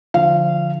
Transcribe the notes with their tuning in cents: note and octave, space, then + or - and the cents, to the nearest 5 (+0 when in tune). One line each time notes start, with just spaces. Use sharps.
D3 +0 F3 +0 F5 -25